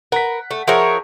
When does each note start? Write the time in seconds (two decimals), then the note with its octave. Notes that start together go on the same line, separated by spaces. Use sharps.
0.12 A#4 B4 F#5 B6
0.51 A3
0.68 F3 G#4 A#4 C#5 E5 F#5